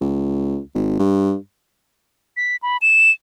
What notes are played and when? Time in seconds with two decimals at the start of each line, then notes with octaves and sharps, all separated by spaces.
0.01 C#2
0.74 G#1
0.99 G2
2.37 B6
2.63 B5
2.82 E7